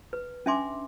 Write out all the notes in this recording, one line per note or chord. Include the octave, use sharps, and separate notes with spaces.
B4
C#4 D4 E5 G#5 C6 D6